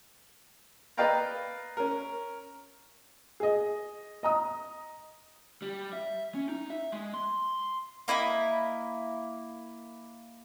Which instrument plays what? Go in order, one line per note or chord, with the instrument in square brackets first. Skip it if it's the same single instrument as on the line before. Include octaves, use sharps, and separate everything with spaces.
[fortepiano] B4 D5 D#5 F5 G5 A#5
C#4 A#4
[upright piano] G#4 D#5
D#5 A#5 D#6
[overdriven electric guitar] G3
E5
C#4
D#4
E5
G#3
C6
[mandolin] A#3 E4 D#5 B5